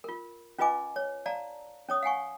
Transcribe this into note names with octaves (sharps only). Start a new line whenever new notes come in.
F4 A#4
C#4 F4 B4 D#5 G#5 D6
C#5
D5 F5 A5 A#5
C#4 C#5 D#6
F5 F#5 G#5 C#6